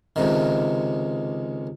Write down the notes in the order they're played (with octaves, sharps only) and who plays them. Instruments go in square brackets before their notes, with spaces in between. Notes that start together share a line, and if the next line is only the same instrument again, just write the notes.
[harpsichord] C#2 C3 D#3